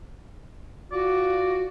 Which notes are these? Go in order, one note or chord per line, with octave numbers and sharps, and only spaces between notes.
F4 F#4 D5